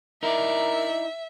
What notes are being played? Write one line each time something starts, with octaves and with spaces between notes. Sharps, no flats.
D#4 E4 A#4 D5 E5